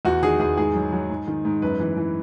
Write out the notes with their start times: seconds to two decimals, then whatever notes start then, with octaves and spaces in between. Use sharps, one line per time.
0.05 E2 F#4
0.23 D#3 G#4
0.40 E2 G#4
0.57 G#2 G#4
0.75 F#3
0.92 F#3
1.10 G#2
1.28 D#3
1.45 G#2
1.62 F#2 B4
1.80 E3
1.97 E3